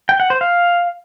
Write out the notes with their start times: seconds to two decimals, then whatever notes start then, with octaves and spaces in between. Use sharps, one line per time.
0.09 G5
0.20 F#5
0.30 C5
0.41 F5